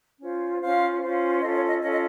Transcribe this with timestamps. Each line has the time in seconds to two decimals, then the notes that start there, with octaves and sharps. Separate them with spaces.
0.20 C#4 F4 C5
0.61 C#4 F4 C5 F5
1.02 C#4 F4 C5
1.42 C#4 F4 A4 D#5
1.55 C#5
1.68 D#5
1.82 C#4 F4 A4 D#5
1.92 D#5